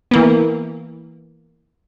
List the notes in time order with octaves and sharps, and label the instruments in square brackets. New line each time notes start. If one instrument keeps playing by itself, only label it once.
[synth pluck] E3 A#3 B3